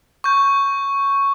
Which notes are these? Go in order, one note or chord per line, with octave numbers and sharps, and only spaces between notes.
C#6 G6